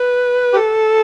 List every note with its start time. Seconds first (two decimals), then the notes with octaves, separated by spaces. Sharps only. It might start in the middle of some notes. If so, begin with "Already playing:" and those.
Already playing: B4
0.53 G4
0.57 A4